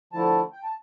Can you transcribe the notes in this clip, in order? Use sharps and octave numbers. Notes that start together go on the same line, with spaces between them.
D3 F3 A3 E4 A5
G5
A5